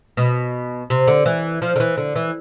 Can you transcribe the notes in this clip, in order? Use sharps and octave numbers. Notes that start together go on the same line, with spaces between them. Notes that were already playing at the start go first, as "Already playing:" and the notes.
B2
C3
D3
E3
F3
D3
E3
D3
E3